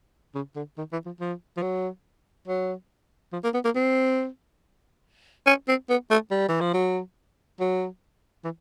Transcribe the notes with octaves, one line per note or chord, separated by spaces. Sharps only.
C#3
D3
D#3
E3
F3
F3
F3
F#3
F#3
F3
A#3
B3
A#3
C4
C#4
C4
B3
A3
G3
E3
F3
F#3
F#3
E3